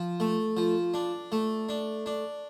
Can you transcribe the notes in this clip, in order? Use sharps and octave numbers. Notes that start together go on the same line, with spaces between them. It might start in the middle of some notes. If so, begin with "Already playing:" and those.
Already playing: F3
A3
F3
D4
A3
D4
D4